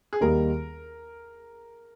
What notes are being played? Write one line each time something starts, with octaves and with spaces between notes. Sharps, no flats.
G#4
D#2 D#3 G3 A#3 D#4 A#4